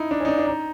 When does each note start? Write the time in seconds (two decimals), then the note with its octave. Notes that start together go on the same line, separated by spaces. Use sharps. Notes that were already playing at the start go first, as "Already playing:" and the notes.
Already playing: D#4 E4
0.11 D4
0.20 C#4
0.25 D#4
0.28 D4
0.38 D4
0.46 D#4